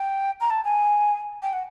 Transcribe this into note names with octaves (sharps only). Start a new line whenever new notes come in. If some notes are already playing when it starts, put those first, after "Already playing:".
Already playing: G5
A#5
A5
G#5
G5
F#5